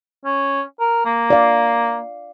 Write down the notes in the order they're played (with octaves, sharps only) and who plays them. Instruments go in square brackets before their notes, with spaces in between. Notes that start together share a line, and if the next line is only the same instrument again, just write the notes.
[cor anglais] C#4
A#4
A#3
[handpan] D5 F5